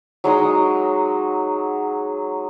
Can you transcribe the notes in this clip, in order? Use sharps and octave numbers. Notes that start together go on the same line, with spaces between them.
F#3 G#3 D#4 D#6